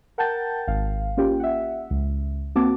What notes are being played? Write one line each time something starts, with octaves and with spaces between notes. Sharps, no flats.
A#4 F#5 G5 A5 G6 A6
G#1 F5
A#3 C#4 F4 G4 G5
E5 F#5
C#2
A#3 C4 F#4 A5 D6